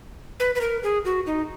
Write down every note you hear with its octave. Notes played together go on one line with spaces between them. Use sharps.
B4
B4
A#4
G#4
F#4
D#4